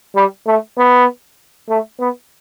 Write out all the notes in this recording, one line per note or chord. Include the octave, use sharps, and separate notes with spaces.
G3
A3
B3
A3
B3